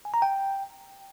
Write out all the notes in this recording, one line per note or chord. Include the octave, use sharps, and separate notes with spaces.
G#5
A#5
G5